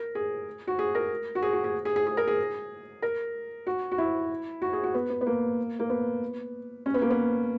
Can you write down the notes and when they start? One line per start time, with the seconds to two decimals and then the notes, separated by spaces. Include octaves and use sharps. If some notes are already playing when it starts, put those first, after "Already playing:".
Already playing: A#4
0.15 G#4
0.67 F#4
0.79 G#4
0.95 A#4
1.35 F#4
1.42 G#4
1.53 F#4
1.64 G#4
1.85 G#4
1.96 G#4
2.06 G#4
2.17 A#4
2.27 G#4
3.02 A#4
3.67 F#4
3.92 F#4
3.98 E4
4.62 F#4
4.73 G#4
4.84 F#4
4.94 B3
5.10 B3
5.21 B3
5.26 A#3
5.80 A#3
5.90 B3
6.86 C#4
6.94 B3
7.02 A#3
7.10 B3